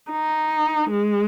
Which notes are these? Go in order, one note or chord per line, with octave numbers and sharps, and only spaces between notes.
D#4
G#3